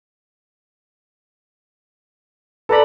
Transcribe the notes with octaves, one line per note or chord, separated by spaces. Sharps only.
A4 B4 D5 A#5 B5